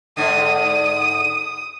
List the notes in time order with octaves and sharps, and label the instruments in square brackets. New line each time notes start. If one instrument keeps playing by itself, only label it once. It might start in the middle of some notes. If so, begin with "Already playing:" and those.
[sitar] G#2 D3 [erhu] D#6